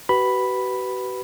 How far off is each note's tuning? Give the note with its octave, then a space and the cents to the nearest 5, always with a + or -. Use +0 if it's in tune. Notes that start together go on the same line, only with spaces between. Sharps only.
F#4 +45 B4 +0 B5 +0